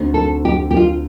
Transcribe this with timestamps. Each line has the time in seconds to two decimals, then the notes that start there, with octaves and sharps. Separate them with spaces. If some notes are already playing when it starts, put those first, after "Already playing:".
Already playing: D2 D3 A3 C4 D#4
0.14 A4
0.45 G4
0.71 G4
0.77 F4